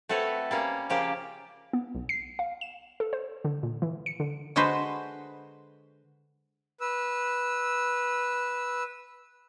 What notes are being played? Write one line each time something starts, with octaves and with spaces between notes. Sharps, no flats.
A3 C4 F#4 A4 B4 C#5
G3 A#3 C#4
C#3 F3 A#3 G4
B3
B1
C7
F5
E7
A4
C5
D3
A#2
E3
C#7
D3
D3 G#3 F#4 B4 C5
B4 E6